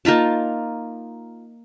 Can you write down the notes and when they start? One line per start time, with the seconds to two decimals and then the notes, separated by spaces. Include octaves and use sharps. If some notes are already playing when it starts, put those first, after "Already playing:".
0.05 A#3 D#4 F4 A5